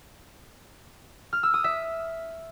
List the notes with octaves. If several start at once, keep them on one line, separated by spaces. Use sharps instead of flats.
F6
E6
D#6
E5